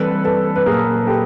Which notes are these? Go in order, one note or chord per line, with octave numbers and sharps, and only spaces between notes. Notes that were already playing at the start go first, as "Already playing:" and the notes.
Already playing: E3 G3 C4 A4 B4
A4 B4
B4
A#2 F#3 A#3 G#4 A#4
G4 A4